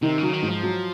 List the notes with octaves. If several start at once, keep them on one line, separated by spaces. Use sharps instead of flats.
C3 D#3
C#3 F#3
D#3
G#2
F3
F#3